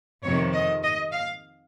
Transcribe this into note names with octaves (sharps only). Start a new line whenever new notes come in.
F2 C3 D#3 C#5
D#5
D#5
F5